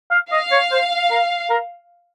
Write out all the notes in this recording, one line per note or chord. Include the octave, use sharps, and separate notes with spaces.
F5
D#5 F5
C#5
C5
A#4
A#4